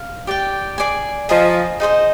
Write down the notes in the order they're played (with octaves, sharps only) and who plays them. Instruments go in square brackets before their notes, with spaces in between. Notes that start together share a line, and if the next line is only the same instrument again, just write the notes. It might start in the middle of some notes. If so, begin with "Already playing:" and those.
Already playing: [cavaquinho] F5
G4 D5 G5
G#4 D5 G#5
[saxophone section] F3 [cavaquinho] G#4 D#5 A#5
[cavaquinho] D#4 G#4 C5 D#5